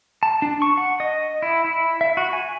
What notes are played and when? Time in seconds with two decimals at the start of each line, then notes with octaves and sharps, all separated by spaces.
0.23 A5
0.42 D4
0.62 C#6
0.77 F#5
1.00 D#5
1.42 E4
1.65 E4
2.01 E5
2.17 F#4
2.33 G#5